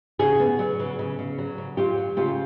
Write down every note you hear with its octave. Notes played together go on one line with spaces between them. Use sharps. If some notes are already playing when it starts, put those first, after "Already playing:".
C#3 F#4 G#4
B3
F#3
C#3
C#3
C#3
F#3
C#3
F#3 F4 G4
F#3
C#3 F4 G4